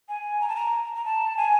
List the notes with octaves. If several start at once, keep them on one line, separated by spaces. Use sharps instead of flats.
G#5
A#5
A5
A#5
A#5
A5
G#5